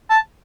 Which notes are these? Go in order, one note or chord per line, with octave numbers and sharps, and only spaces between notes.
A5